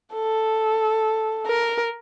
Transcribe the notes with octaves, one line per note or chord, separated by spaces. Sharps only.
A4
A#4